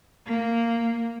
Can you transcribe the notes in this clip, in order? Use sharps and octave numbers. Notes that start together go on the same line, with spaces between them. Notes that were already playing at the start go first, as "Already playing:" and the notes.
A#3